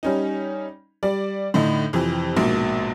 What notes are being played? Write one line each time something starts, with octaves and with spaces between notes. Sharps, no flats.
G3 C#4 D#4
G3 D5
A2 D3 A3 D#4
F2 C3 E3
A#1 G#2 B2 A#3